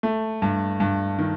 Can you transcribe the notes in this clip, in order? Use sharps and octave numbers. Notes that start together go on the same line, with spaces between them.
A3
G2
G2
D#3